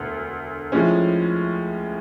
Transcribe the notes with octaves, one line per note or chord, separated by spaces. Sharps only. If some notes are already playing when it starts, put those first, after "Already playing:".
Already playing: E1 D2
A2 F3 G#3 C#4